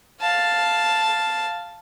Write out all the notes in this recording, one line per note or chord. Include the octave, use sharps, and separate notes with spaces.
F5 A5